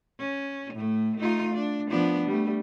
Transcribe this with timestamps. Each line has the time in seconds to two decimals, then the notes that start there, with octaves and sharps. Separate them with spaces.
0.20 C#4
0.74 A2 A3
1.19 A3 D#4 F4
1.54 D4
1.90 F3 B3 D4
2.28 G3 A3